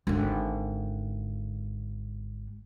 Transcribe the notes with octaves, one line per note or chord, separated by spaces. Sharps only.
G#1 D3